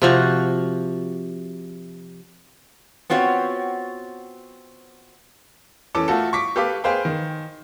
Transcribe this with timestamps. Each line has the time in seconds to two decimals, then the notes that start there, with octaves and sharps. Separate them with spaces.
0.02 C3 F3 F#4
3.10 B3 C4 F4 F#4 C#5
5.95 E3 C#4 A4 D6
6.08 A3 F4 F#4 A4
6.33 C#6 D6 B6
6.56 G4 A4 B4 F5 D6
6.84 G#4 B4 C5 F5 G5
7.05 D#3